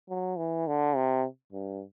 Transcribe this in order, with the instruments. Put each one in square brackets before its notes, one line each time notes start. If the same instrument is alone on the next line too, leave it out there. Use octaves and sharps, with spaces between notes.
[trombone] F#3
E3
D3
C3
G2